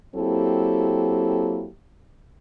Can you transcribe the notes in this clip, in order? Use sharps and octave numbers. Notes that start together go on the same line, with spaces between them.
F#3 A#3 C4 E4 G4 A4